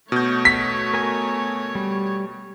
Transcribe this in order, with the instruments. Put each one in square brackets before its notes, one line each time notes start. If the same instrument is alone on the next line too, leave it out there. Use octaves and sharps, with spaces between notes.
[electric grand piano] B2 G6 [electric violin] A3 C#5
[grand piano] B6
[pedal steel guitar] A#4 G#5
G3